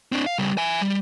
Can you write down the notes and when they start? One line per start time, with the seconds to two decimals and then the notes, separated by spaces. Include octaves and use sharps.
0.12 C4 D4
0.26 F5
0.38 C#3 G3
0.58 E5 G#5
0.81 G3